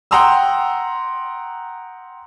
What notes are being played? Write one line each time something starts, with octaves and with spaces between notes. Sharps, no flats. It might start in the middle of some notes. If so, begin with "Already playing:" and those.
F#5 G5 A#5 C6 D#6 E6